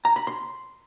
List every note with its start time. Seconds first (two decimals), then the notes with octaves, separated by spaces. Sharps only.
0.05 A#5
0.16 B5
0.27 C6